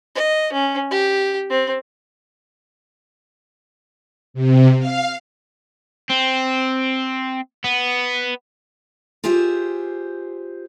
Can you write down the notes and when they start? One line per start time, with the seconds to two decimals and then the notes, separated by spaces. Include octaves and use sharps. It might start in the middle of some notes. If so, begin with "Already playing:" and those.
0.15 D#5
0.53 C#4
0.91 G4
1.50 C4
4.34 C3
4.79 F5
6.10 C4
7.64 B3
9.24 F4 G4 G#4 C5 E5